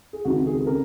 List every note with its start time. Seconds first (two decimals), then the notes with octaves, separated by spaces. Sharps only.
0.13 G#4
0.25 C#2 C3 D#3 F#4
0.47 G#4
0.58 G#4
0.67 C#3 A#4